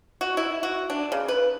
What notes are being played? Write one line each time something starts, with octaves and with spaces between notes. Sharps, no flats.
F#4
E4
F#4
D4
C#3
B4